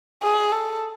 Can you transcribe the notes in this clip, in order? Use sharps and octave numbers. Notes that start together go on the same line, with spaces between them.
G#4
A4